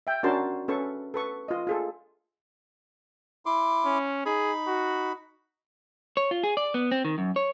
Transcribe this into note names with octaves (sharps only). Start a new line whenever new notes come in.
E5 G5
C#4 D4 F#4 A#4 A5 C6
C#4 A4 B4 C#6
A4 B4 C#6
F4 D#5
F4 G#4 A4
E4 C6 D6
C#4
D#4 G#4 B5
F#4
C#5
F4
G#4
D5
B3
C4
D#3
F#2
C#5